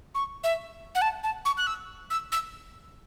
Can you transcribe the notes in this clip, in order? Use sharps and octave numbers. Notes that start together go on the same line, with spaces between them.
C#6
E5
F#5
A5
A5
C#6
F#6
E6
E6
E6